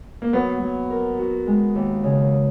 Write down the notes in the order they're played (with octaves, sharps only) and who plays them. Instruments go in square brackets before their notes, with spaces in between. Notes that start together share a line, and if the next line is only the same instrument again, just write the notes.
[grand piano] A#3
[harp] F#3 [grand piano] B3
[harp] F#3
A#4
F#4
G#3
D#2
C#3